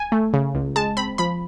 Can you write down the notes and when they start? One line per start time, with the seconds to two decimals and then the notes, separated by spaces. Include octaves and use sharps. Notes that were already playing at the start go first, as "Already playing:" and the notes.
Already playing: G#5
0.12 A3
0.33 C#3
0.55 C#2
0.76 G#3 A5
0.97 C4 B5
1.18 F3 B5